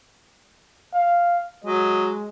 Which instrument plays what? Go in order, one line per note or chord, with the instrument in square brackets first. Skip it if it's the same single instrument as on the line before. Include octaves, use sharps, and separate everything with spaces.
[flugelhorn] F5
[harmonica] F#3 D#5 [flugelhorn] G#3